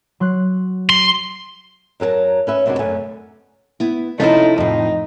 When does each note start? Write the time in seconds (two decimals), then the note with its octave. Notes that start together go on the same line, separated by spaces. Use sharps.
0.20 F#3 C6 F#6
0.90 C6
2.00 F#2 F#3 A4 A#4 A5
2.47 C#4 B4 E5
2.66 F#2 C3 G#3 C#4 D4 F#4
2.79 F#2 D3 A3 B3 G#5
3.80 B3 E4
4.20 C3 F3 A3 C#4 D#4 E4 A4
4.58 F2 A2 D#4